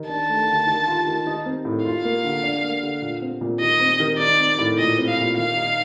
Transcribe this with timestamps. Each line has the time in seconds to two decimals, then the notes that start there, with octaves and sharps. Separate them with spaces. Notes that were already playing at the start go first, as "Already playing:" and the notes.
Already playing: D#3
0.09 D4 A5
0.29 A3
0.48 D3
0.67 D#3
0.88 F4
1.07 D#3
1.26 D#4
1.46 C4
1.65 A2
1.85 F4 F5
2.04 A#3
2.24 D3
2.43 D4
2.63 A#3
2.83 D3
3.02 A#2
3.22 C4
3.41 A#2
3.60 D#3 D#5
3.80 C4
4.00 D#3
4.19 D#4 D5
4.40 C4
4.59 A2
4.78 A#2 D#5
4.98 C4
5.08 F5
5.17 A#2
5.37 D#3 F5
5.57 D#4